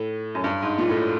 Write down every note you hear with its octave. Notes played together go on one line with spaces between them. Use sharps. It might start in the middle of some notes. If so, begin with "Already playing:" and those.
Already playing: A2
F#2
G2
G#2
A#2
A2